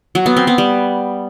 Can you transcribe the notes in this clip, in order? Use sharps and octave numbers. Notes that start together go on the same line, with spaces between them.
F#3
B3
C4
B3
G3